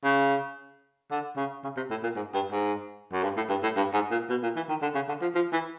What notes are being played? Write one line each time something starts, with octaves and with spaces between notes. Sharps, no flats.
C#3
D3
C#3
C#3
C3
A2
A#2
G#2
G2
G#2
F#2
G2
A2
G2
A2
G2
G#2
A#2
B2
A#2
E3
D#3
D3
C#3
D3
F3
F3
E3